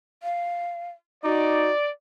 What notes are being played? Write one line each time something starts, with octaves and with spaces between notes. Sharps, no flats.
F5
D#4 F#4 D5